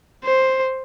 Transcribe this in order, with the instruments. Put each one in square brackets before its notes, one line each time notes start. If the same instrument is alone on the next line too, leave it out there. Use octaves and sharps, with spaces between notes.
[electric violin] C5